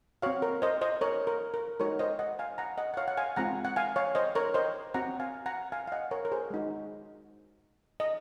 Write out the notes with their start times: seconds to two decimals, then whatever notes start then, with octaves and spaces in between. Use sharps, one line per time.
0.22 C4 F#4 C#5 F5
0.42 A#4
0.62 C5 D#5
0.81 C5 D#5
1.01 A#4 C#5
1.27 A#4
1.54 A#4
1.80 G#3 D#4 F#4 A#4 C#5
1.99 C5 D#5
2.19 D#5 F#5
2.39 F5 G#5
2.58 F#5 A#5
2.78 D#5 F#5
2.94 F#5
2.97 C#5 F5
3.08 F#5
3.17 F5 G#5
3.36 G#3 C4 F4 F#5 A#5
3.65 F#5
3.76 F5 G#5
3.96 C#5 F5
4.15 C5 D#5
4.35 A#4 C#5
4.54 C5 D#5
4.94 C4 F#4 F#5 A#5
5.20 F5 G#5
5.46 F#5 A#5
5.72 F5 G#5
5.87 F5
5.92 D#5 F#5
6.11 A#4 C#5
6.25 A#4
6.32 G#4 C5
6.50 G#3 D#4 F#4
8.00 D#5